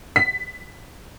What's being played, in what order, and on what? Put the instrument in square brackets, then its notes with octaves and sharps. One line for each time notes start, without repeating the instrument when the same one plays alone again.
[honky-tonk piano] B6